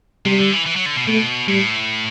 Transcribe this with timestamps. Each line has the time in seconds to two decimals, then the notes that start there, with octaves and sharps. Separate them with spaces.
0.25 C3 G3
0.38 D3
0.53 E3
0.66 E3
0.76 F#3
0.86 D3
0.96 B2
1.07 B2 A3
1.48 A2 G3